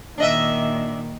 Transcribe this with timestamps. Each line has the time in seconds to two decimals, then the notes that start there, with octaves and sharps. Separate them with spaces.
0.18 A#2 D#3 D4 D#5 E5